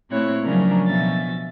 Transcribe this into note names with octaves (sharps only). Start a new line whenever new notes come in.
A#2 A3 C4 E4 C#5 F#6
C#3 F3 F#3 C#4 D4 A#4
B2 F3 C#4 E5 A6